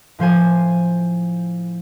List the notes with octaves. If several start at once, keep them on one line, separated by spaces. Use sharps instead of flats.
A2 F3 C5 G#5